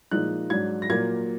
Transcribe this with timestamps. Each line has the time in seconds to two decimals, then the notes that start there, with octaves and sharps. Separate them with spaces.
0.11 A#2 F3 G#3 D#4 F#6
0.50 G#2 F#3 D4 G#6
0.82 A#6
0.89 A#2 F#3 A#3 G#6